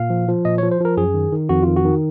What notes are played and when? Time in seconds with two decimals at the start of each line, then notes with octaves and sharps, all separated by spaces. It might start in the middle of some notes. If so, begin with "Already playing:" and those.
Already playing: A#2 F5
0.10 F3
0.28 F3
0.45 A#2 D#5
0.58 C#5
0.62 F3
0.72 C5
0.81 F3 A#4
0.97 F#2 G#4
1.14 D#3
1.32 D#3
1.49 F2 F#4
1.63 D#3 F4
1.76 F#4
1.85 D#3